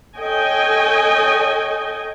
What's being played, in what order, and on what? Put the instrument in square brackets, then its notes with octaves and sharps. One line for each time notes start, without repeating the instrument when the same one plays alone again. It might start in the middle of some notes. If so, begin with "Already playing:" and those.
[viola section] A4 C#5 D#5 G5 G#5